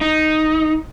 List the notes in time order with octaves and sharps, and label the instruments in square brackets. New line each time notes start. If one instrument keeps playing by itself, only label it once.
[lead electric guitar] D#4